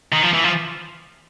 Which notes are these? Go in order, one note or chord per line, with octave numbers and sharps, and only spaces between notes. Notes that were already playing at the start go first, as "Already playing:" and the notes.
D#3
F3
E3
F3